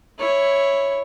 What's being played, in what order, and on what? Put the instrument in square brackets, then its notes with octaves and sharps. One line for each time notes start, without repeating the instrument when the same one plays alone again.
[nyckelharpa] E4 C#5